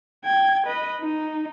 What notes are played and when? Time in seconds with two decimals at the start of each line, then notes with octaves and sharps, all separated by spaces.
0.25 G5 G#6
0.66 B4 D#5
1.01 D#4